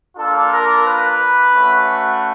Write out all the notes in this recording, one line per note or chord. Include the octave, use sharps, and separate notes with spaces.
A#3 D4 F4 A4
A#4
B4
A3 C#4 F#4